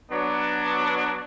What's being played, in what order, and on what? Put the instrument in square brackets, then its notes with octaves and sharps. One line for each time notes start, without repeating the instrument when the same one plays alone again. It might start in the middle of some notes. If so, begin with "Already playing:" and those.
[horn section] F#3 B3 D4